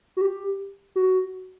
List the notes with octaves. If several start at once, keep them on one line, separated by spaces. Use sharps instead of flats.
F#4
G4
F#4